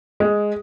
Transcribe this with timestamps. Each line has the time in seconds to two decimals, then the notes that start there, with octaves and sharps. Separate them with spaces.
0.20 G#3